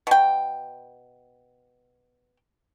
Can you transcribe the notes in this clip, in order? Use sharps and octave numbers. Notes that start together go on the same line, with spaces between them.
B2 G5